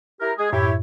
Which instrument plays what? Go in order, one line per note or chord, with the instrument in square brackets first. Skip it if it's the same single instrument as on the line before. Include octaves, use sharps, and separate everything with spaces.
[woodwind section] E4 G4 A#4
G#3 G#4
[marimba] F#2 A2 [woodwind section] E4 G4 C#5